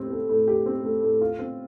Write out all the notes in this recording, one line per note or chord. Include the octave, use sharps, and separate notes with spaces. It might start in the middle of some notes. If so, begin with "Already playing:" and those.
Already playing: A2 A3 C4 G4
A3
A2
G4
C4
A3
A2
F4
C4